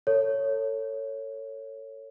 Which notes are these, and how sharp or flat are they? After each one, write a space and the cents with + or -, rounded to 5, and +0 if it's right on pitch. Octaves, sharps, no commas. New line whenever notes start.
A4 +30 C#5 +0